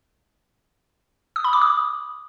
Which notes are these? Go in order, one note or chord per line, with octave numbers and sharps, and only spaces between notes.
D#6
B5
D6
D#6